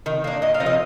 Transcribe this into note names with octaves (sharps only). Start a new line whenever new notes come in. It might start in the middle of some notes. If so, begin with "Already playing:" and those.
D#3
A#3 D4
A#2 D#5
F5
F3 C4 D#4
D#5